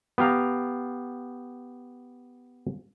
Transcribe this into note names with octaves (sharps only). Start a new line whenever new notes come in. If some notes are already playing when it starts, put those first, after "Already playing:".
B3 G4 F5 A#5